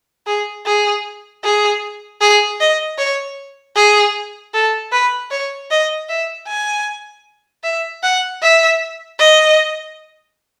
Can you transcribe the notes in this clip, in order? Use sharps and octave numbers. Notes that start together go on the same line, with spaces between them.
G#4
G#4
G#4
G#4
D#5
C#5
G#4
A4
B4
C#5
D#5
E5
G#5
E5
F#5
E5
D#5